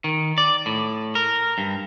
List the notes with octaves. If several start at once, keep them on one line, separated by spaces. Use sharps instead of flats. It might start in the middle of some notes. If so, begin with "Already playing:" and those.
D#3
D5
A2
A#4
G2